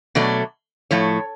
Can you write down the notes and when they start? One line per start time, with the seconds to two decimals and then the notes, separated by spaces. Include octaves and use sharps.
0.15 B2 F#3 A3 D5
0.91 A2 F3 A3 C#5